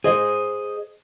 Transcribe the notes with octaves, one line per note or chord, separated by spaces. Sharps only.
G#4 C5 D#5